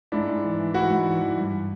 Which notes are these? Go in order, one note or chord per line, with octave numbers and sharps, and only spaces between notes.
G#2 D4 E4
G#2
E3
E3
G#2 E4 F#4
G#2
E3
E3
G2